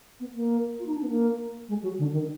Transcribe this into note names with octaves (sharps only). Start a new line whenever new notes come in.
B3
A#3
F4
D#4
D4
B3
A#3
G#3
F#3
D3
D#3